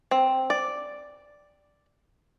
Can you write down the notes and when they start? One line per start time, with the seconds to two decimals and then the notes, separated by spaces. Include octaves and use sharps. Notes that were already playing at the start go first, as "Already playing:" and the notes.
0.11 C4
0.50 D5